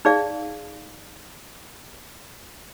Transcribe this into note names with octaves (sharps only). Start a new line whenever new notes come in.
D#4 G#4 D5 F5